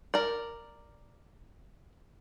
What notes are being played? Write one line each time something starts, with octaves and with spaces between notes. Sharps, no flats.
A#4 D5